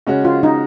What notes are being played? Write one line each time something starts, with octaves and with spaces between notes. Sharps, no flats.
C#3 G#3 C#4 F#4
F4
D#4